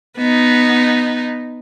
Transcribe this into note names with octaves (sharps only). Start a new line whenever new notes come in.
B3 D#4